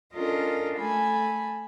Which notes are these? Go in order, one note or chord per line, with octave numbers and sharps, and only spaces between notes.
C#4 D4 F4 A4 A#4 D#5
A3 A4 G#5 B5